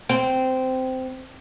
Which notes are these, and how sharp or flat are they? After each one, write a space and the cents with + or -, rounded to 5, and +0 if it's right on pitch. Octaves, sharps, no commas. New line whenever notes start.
C4 -15